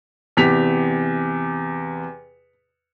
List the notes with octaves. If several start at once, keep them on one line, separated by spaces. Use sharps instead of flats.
E2 C3 G4 B6 F7